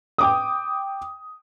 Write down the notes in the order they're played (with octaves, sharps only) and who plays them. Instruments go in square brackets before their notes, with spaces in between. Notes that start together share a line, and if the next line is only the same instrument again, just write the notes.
[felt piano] G5 D6 D#6